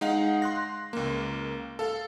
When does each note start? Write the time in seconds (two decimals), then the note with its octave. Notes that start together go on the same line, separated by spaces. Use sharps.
0.01 G#3 D#4 F5 F#5
0.42 C6 F#6 A#6
0.93 C#2 A#3
1.79 A4 F5